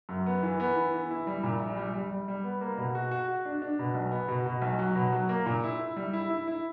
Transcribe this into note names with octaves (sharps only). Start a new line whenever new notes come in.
F#2
B3
E3
B3
E3
E3
E4
G3
A#2
A#1
G3
G3
G3
G3
B3
A#3
B2
F#4
F#4
F#4
D4
D4
B2
B1
B3
B2
B2
B1
F#3
B2
F#3
A#3
A#2
E4
E4
G3
E4
E4
E4